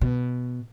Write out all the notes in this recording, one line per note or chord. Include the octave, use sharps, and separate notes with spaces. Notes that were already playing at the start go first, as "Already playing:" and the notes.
B2